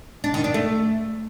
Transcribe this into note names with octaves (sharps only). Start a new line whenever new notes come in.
D4
D#3
D4
A3